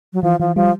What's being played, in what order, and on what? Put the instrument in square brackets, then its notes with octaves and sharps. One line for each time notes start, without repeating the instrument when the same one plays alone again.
[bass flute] F#3
[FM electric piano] E3 [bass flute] F3
[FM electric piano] E3 [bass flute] F3
[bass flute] F3 [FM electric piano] G3